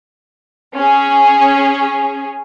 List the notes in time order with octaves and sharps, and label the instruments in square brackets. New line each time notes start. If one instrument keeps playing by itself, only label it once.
[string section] C#4 G#4